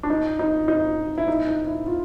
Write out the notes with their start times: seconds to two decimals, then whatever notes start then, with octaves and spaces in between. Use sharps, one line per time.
0.03 D4
0.10 D#4
0.39 D#4
0.68 D#4
1.18 E4
1.28 D#4
1.48 D#4
1.67 E4
1.87 F4